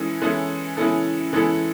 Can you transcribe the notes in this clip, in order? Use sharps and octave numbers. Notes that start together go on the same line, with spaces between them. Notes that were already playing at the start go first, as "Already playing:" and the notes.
Already playing: E3 G#3 C#4 E4 A4
E3 G#3 C#4 E4 A4
E3 G#3 C#4 E4 A4
E3 G#3 C#4 E4 A4